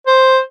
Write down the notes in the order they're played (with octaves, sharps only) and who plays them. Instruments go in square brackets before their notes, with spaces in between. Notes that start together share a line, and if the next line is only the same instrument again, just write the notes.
[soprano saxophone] C5